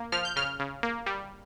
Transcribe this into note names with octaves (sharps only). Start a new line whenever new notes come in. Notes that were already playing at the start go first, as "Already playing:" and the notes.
Already playing: A#3
F3 F6
G6
C#3 F6
C#3
A#3
G3